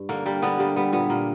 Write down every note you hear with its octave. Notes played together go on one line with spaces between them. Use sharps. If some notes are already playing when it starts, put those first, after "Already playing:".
Already playing: G2
D3 A#3
G3 A#3
D3 B3
G3 A#3
G3 B3
A#2 B3
A#2 A#3